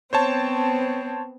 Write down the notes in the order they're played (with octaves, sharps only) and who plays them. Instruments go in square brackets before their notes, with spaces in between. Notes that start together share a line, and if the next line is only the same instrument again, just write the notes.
[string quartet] B3 C4 [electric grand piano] C5 C#5 A5